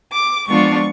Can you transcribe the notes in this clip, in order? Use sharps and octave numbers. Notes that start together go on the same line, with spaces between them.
D6
F3 G#3 B3 D4 F4 C#6